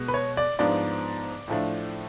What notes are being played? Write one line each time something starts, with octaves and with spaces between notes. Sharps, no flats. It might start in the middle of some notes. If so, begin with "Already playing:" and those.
Already playing: B2 G#3 B3
B4
C#5
D5
G#2 F3 B3 D4 D5
A2 F3 A3 D4